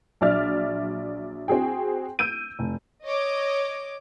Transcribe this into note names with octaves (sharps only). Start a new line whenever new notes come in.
A#1 F#3 D5 E5 F6 A6
C4 F#4 G#4 G5
E6 G6 D7 D#7
F1
C#5 D#5 D6